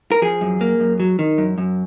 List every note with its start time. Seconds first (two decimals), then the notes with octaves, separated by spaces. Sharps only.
0.12 A#4
0.22 F3 G#4
0.41 F#2
0.61 A#3
0.80 F#2
1.00 F#3
1.19 D#3
1.38 F#2
1.58 F#2